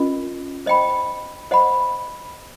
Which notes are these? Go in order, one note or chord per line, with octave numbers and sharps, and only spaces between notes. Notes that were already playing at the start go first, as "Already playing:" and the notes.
Already playing: C#4 F4 A#4 D#5
C5 D#5 G5 B5
C5 D#5 F#5 B5